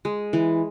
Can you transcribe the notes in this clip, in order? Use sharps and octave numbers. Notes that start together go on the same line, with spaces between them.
G#3
E3